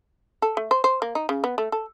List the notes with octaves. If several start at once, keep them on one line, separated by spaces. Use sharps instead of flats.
A4
A3
C5
C5
A#3
D#4
C#3
B3
A3
A4